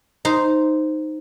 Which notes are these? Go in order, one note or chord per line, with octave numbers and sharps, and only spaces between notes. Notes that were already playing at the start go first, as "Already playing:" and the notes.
D#4 C5